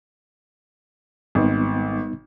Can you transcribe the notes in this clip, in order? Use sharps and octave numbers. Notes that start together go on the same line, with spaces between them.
G#1 G3 B3 D#4